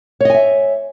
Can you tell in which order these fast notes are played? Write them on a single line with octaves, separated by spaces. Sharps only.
C#5 D#5 G#5 E5